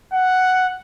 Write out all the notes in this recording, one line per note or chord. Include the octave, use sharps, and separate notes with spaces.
F#5